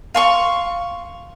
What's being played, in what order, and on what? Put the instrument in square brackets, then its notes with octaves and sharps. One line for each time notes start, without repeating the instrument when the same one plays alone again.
[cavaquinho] F5 C6 C#6